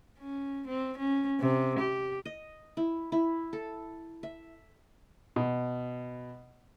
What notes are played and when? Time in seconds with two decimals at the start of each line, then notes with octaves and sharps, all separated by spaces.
0.20 C#4
0.68 C4
0.98 C#4
1.41 C3
1.79 G4
2.25 D#5
2.77 E4
3.12 E4
3.53 A4
4.23 E5
5.36 B2